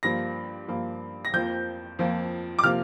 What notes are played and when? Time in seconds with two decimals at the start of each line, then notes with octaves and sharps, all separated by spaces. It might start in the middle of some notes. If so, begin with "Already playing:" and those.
0.03 G2 F3 A#3 A#6
0.68 G2 F3 A#3
1.25 A#6
1.33 F2 F3 A#3 G6
1.99 F2 F3 A#3
2.59 D6
2.63 C3 F3 A#3 F6